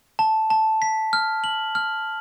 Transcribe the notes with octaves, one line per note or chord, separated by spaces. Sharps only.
A5
A5
B6
F6
F#7
F6